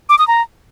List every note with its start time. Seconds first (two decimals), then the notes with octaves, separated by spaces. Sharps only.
0.09 D6
0.18 D#6
0.28 A#5